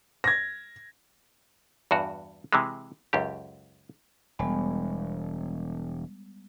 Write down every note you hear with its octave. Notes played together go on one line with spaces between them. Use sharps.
G#6 A#6
E2 G2 F#4
C3 E3 G#3
C#2 F#2 G4
E1 G3 G#3 B3